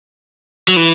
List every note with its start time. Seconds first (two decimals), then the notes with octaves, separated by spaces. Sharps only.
0.68 F#3
0.76 E3